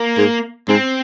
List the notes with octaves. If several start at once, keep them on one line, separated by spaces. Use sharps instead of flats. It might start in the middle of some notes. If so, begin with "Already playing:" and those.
Already playing: A#3
G#2
G#2 C4